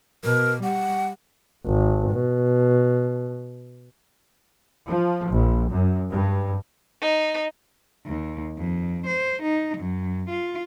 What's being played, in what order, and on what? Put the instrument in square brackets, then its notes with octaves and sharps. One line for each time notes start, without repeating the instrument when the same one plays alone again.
[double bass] B2 [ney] A#4
[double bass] G3 [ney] F#5
[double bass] G#1
B2
[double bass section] F3
A#1
F#2
G2
[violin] D#4
[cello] D#2
F2
C5
D#4
F#2
F4